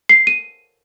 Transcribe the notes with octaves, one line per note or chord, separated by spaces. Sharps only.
C7
D#7